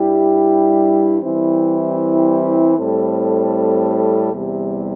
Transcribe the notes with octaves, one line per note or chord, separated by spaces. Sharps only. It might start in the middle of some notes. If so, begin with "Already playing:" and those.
Already playing: G2 G3 E4 G4
E3 G3 C4 E4
A2 G3 C4 A4
E2 C3 G3